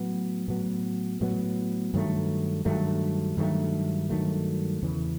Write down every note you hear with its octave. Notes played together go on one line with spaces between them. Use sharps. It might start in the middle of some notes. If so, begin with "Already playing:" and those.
Already playing: A2 F#3 B3
A2 F#3 B3
A2 F#3 B3
G2 D#3 F#3 A3
G2 D#3 F#3 A3
G2 D#3 F#3 A3
G2 D#3 F#3 A3
E2 C#3 E3